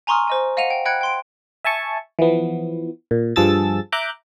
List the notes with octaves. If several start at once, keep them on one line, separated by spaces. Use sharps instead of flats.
G#5 A#5 C6 C#6 D#6 F6
C5 D#5 G#5
D#5 F5 F#5 D#7 F7
G5
D#5 G5 B5 F#6 G#6 C#7
G5 C6 D7
E5 G#5 A5 C#6
E3 F3 B3
A#2
G2 F3 G#4 A5 E6 A6
E5 A#5 D6 F#6 G6